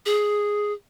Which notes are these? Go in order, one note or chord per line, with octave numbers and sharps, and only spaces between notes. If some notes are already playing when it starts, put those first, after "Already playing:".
G#4